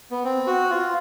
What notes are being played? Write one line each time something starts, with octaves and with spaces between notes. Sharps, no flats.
B3
C4
F#4
F4